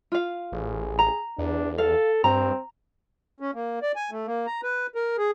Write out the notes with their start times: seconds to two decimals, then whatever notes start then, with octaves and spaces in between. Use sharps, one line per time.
0.12 F4 F5
0.52 A1 G#4
0.99 A#5
1.38 E2 D4
1.78 A4 F5
2.24 G2 C4 A#5
3.40 C#4
3.54 A#3
3.82 D5
3.96 G#5
4.11 A3
4.27 A#3
4.46 A#5
4.63 B4
4.95 A#4
5.18 G#4